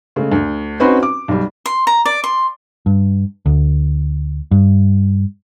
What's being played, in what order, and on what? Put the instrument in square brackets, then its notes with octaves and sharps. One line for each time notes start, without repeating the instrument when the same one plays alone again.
[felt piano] C#3 G#3 A3
D2
C4 C#4 D#4 F#4 B4 C5
D6
B1 G3
[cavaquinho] C6
A#5
D5
C6
[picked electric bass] G2
D2
G2